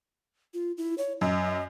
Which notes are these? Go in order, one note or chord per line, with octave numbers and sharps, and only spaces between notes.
F4
E4
C#5
F#2 D#5